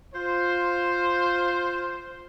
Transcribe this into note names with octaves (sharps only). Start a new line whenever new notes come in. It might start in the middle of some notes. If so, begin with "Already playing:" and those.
F4 C5